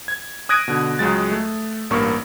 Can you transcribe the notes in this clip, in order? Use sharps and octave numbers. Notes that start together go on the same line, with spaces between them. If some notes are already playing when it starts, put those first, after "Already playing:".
G#6
D#6 F#6 G#6 A#6 D7 D#7
B2 D3
C#2 F#3 G#3 A6
A3
A1 G2 A#3 C#6